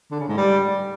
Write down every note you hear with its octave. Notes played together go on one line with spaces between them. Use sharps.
D3
C#3
G#2
G3